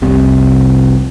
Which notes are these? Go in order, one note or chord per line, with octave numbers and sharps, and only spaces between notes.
F1 C2 C3